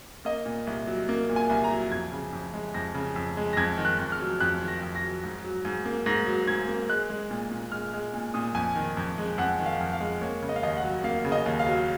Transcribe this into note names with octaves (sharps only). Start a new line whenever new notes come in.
A#3 D#5
A#2
C2
F#3
A#3
A#2
G#5
C2
A#5
F#3
F2 G#6
C#3
F2
G#3
F2 A#6
C#3
F2
G#3
A#6
F2 G#6
D#3
F#6
F2
F6
F#3
F2 F#6
D#3
A#6
F2
A#6
F#3
G#2
F#3
G#2
A#3
G#2 A#6
F#3
G#2 G#6
A#3
G#3 F#6
G#3
A#2
A#2
G#3 F6
G#3
A#2
A#2 D#6
F2 G#5
D#3
F2
G#3
F2 F#5
D#3
F5
F2
F5
G#3
A#3 C#5
C#3
D#5
F5
D#2 D#5
F#5
F#3
A#3 F5
C#3
D#5
D#2
F5
F#3